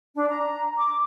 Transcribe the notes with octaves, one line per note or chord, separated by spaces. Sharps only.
D4
A#5
D6